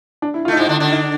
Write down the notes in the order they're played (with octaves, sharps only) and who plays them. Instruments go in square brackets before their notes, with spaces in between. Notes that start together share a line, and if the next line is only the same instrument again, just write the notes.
[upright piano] D4
E4
F4
[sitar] A3
[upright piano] D#4
[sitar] G#2 G#3 [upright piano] E4
[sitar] D3 D4
D3 D4
[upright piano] D#4